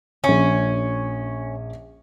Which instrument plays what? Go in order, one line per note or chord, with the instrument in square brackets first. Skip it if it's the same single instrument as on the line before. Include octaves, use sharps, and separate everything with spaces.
[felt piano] A#1 C#6 [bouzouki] C#4